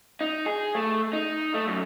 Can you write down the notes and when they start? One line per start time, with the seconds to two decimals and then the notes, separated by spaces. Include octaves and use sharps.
0.21 D#4
0.46 G#4
0.75 A3
1.13 D#4
1.54 A3
1.67 F#2